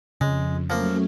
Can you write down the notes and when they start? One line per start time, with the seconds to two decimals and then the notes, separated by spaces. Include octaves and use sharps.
0.21 F2 C#3 G#3
0.70 F3 F#3 A3 A#3 C#4